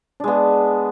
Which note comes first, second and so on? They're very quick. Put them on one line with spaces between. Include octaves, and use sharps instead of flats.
D4 G#3 B3